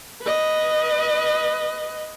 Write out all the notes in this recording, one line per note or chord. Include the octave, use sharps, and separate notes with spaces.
B4 D#5